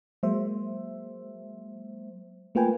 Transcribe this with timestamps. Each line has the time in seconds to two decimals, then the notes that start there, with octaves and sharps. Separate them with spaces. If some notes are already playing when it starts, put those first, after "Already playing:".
0.23 F#3 G#3 A#3 C5 E5
2.55 A3 A#3 F4 B4 G5 G#5